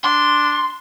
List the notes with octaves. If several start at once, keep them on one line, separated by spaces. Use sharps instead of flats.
D4 C6